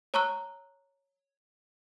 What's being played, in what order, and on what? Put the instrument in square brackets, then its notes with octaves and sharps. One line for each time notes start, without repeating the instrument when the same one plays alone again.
[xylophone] C#5 A5 A#5 C#6 E6 F#6